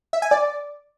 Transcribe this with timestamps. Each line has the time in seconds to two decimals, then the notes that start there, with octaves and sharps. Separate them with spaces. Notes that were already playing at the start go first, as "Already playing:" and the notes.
0.13 E5
0.22 G#5
0.31 D5